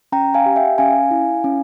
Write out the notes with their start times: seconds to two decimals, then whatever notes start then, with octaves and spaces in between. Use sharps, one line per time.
0.12 C#4 G5 A#5
0.34 F5 G#5
0.46 G4
0.56 E5 G5
0.78 C#4 F5 G#5
1.11 E4
1.44 C#4